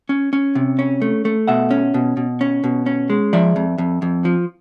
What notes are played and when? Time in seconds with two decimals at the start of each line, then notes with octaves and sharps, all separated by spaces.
0.09 C#4
0.33 C#4
0.55 C3
0.79 C#4
1.02 A3
1.25 A3
1.48 B2 E5 F#5
1.71 C#4
1.94 B2
2.17 B2
2.41 C#4
2.64 B2
2.86 C#4
3.10 G#3
3.33 F3 D5 E5
3.56 F2
3.78 F2
4.02 F2
4.25 F3